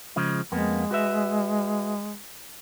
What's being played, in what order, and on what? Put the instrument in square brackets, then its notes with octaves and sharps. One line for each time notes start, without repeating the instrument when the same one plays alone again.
[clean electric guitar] C#3 F3 G#3
[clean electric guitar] F2 A#3 B3 [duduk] G#3
[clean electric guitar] F#4 B4 E5